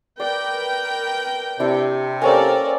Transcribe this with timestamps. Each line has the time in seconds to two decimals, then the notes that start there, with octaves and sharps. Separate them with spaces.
0.20 A#4 B4 D5 G5
1.59 C3 D4 E4
2.22 A#3 C#4 A4 A#4 C5 D5 G5 G#5